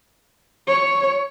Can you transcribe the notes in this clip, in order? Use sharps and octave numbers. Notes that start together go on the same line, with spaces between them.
C#5